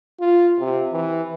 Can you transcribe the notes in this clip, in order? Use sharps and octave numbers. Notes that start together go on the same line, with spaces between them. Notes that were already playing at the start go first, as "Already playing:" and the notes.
F4
C3
E3